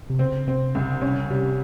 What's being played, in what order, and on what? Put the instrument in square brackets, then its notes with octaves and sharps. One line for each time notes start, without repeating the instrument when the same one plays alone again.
[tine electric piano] C3
[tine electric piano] C#3 [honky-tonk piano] C4
[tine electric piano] C3 [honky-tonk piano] C4
[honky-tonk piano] C2 [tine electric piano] C#3
[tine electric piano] C3 [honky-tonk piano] C#4
[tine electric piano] C#3
[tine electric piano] C3 [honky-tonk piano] G3
[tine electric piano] C3